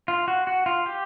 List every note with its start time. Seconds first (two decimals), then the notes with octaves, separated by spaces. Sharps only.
0.08 F4
0.28 F#4
0.47 F#4
0.66 F4
0.86 G4